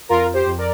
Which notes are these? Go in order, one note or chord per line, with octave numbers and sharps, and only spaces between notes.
F2 F4 A#4
G4 C5
F2
A#4 D5